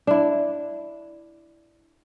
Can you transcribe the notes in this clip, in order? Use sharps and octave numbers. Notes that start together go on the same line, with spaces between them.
D4 E4